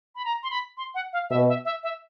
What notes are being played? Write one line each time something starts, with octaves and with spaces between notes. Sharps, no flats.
B5
A#5
C6
B5
C6
F#5
F5
B2 E5
E5
E5
E5